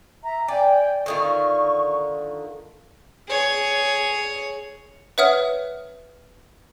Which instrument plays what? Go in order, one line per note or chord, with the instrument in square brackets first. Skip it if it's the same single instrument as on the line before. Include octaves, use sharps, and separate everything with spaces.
[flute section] E5 A#5
[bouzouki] D5 [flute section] G5 G#5
[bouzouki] D3 D#3 F4 [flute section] C#6
[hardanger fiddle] G#4 C#5
[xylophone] B4 C#5 E5 F#5 D#6 F6